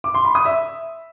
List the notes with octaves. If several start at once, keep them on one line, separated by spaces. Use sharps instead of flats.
D6
C6
B5
D#6
E5